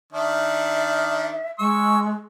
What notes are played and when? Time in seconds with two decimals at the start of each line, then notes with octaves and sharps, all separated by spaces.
0.13 D#3 D4 E5
1.59 G#3 C#6 E6